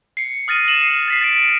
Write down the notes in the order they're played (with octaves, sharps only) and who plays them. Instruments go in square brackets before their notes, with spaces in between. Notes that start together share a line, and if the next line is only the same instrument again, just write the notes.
[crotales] C7 C#7
D#6 F6 A6 A#6 D#7
C#7 E7 F#7
C7 D#7
A6 B6 C7
A6 C7 D7